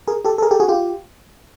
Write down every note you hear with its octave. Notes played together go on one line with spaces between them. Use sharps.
G#4 A#4
G4 A4
A4
G#4 A#4
G4 A4
F#4 G#4
F4 G4